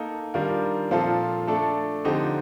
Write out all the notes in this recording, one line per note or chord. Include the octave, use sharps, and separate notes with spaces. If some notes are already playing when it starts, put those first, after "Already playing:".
Already playing: A#3 D#4 A4
D#3 G3 D4 F4 A#4
A#2 F3 C4 F4 A4
A3 D4 A4
D3 F3 C4 D#4 G4